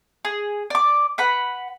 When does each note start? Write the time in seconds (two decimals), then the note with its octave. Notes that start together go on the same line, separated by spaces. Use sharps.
0.25 G#4
0.70 D5 D6
1.18 B4 F#5 B5